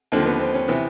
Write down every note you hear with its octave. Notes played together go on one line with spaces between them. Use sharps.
D#2 D3 F3 C4
B3
C4
C#4
C3 E3 B3